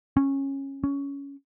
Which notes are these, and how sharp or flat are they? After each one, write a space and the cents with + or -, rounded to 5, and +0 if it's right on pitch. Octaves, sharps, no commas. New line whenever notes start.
C#4 -15
C#4 +15